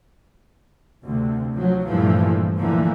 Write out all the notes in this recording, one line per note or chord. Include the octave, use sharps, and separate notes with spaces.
D2 C3
F3 F#3
G2 A#2 E3 F3 A3
D2 A#2 D3 E3 F3 A#3